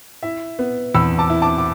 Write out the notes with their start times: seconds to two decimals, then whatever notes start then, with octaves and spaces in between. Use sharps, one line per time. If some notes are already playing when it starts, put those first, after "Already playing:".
0.23 E4 E5
0.59 B3
0.95 E2 B5 E6
1.18 A5 D6
1.30 E4
1.42 A5 D6
1.58 D6